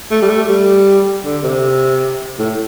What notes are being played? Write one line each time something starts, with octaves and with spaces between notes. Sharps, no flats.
A3
G3
A3
G3
D3
C3
A2